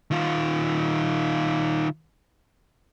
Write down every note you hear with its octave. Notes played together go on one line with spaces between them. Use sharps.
D#3 F4